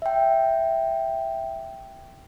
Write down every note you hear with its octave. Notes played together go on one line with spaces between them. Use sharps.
E5 G5